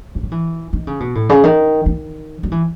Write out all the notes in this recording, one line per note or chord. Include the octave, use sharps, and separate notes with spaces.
E3
F#3
E3
D#3
C#3
B2
A2
C#3
D#3
D#3
F#3
E3